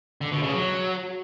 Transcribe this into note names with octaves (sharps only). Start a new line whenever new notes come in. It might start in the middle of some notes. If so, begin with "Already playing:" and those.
D3
B2
C#3
F#3